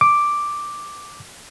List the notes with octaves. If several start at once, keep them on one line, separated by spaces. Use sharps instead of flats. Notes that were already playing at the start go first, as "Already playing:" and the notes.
D6